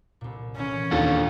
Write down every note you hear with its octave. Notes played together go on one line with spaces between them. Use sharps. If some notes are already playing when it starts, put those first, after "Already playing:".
C2 A#2
A#2 E3 C#4
D#2 D4 F4 A4